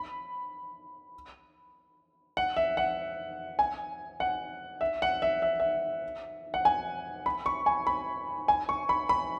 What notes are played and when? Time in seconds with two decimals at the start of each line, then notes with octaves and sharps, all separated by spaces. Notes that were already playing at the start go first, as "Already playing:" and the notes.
Already playing: B5
2.37 F#5
2.56 E5
2.77 F#5
3.59 G#5
4.20 F#5
4.81 E5
5.02 F#5
5.22 E5
5.42 E5
5.60 E5
6.54 F#5
6.65 G#5
7.26 B5
7.46 C#6
7.66 G#5
7.87 B5
8.48 G#5
8.69 C#6
8.89 B5
9.09 B5